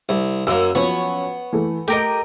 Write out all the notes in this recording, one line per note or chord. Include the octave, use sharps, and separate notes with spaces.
C2
F#2 A#3 E6
F3 F#3 B3 C#4 C#5
E3 A3
A3 G4 A#4 D#5 D7